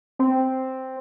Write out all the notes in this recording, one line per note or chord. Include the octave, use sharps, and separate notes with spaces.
C4